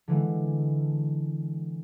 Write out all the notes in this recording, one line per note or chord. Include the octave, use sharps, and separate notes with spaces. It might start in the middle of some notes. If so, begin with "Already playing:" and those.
D3 E3 G#3